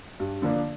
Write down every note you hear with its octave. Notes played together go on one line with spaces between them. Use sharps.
G2
D3 F3 A#3 D4